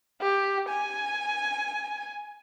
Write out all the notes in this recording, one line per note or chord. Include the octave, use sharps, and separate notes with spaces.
G4
G#5